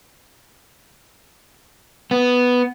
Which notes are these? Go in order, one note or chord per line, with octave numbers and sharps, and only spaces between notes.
B3